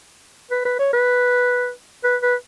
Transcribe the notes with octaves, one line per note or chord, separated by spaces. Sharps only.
B4
B4
C#5
B4
B4
B4